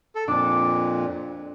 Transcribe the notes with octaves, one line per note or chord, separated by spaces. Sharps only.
A4
F2 A#2 D4 D6